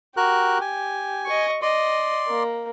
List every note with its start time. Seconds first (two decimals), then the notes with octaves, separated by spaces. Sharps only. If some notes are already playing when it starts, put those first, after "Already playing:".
0.17 F#4 G4 A#4 F#6
0.61 G#5
1.26 D#5 C#6
1.62 D5 D#5 C6
2.28 A#3